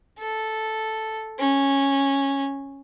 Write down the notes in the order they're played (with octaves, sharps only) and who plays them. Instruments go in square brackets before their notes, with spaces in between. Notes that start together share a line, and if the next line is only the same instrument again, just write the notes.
[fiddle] A4
C#4